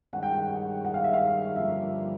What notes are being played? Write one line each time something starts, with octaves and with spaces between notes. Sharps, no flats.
G2 D#3 G#3 C#4 F#5
G5
F#5
F#5
F5
E5
F5
G2 D3 F3 A#3 E5